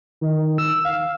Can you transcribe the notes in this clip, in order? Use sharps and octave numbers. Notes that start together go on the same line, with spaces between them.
D#3
E6
F5